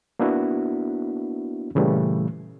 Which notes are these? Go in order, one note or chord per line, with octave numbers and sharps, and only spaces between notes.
A#3 B3 D4 E4 F#4
A#2 C#3 E3 G3 A3